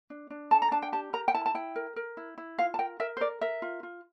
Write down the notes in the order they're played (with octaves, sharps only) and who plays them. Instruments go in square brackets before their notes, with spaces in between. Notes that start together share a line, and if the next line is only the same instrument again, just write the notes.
[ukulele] D4
D4
A4 A5
A#5
D4 A5
G5
G4 A5
A#4 A#5
G5
E4 A5
A5
E4 G5
A#4
A#4
E4
E4
F4 F5
A5
A#4 G5
A#4 E5
C5
A#4 D5
A#4 E5
F4
F4